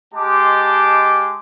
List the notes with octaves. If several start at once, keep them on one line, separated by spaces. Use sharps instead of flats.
G#3 G4 D#5 A5 C6 D6